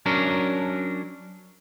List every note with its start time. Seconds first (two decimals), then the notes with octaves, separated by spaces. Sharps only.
0.06 F#3 C#4 D4 A#4